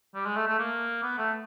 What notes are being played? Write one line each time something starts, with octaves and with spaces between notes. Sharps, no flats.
G3
G#3
A3
A3
A#3
B3
A3